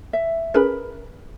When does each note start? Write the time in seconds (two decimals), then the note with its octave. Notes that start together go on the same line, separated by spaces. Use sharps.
0.13 E5
0.54 C#4 G#4 A#4 B4 B5